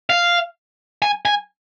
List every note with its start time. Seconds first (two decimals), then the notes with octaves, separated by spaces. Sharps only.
0.10 F5
1.02 G#5
1.25 G#5